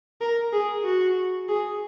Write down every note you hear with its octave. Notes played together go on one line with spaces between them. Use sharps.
A#4
G#4
F#4
G#4